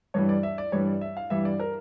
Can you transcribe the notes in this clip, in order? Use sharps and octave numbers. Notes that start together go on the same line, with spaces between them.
G2 E3 G3 C#5
D5
E5
D5
G2 E3 G3 C#5
D5
E5
F5
G2 E3 G3 E5
D5
A#4